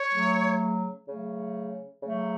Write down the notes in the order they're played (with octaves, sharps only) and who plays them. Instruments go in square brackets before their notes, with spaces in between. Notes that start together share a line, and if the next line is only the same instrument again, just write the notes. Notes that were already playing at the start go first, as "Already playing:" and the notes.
Already playing: [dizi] C#5
[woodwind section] C#3 F#3 A3
C#3 F#3 A3
C#3 F#3 A3